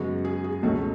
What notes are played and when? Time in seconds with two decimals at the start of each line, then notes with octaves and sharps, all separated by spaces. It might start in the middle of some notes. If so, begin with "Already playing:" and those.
Already playing: F#2 C#3 G#3 B3 F#4
0.25 G#4
0.44 G#4
0.63 C#2 B2 A3 C#4 A4